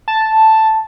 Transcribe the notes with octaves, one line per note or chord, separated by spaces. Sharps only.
A5